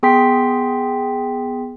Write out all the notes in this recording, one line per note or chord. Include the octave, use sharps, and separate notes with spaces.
B3 G#4 G5 C6 B6